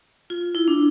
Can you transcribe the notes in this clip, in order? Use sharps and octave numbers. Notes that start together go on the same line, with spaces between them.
F4
E4
D4